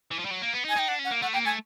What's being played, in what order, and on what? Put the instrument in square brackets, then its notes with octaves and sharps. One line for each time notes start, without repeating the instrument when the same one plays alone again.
[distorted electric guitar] E3
F3
G3
F#3
A#3
B3
D#4
[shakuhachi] G#5
[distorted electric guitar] D#4 [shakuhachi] G5
[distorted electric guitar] D4 [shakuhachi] F#5
[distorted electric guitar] C#4
[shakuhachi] F#5
[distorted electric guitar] A#3
[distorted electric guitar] A3 [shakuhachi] F#5
[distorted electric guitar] A#3 [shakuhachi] G5
[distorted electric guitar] A3 [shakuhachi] G#5